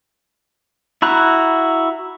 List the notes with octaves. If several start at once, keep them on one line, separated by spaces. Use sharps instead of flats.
E4 F#4 A#5 F#6